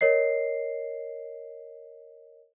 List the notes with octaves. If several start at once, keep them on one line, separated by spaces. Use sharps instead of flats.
A#4 C#5 D#5 C7